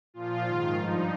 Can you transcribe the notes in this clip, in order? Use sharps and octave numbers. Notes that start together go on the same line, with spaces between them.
A#2 F3 F4
G#2 D#3
G2 F3 D#4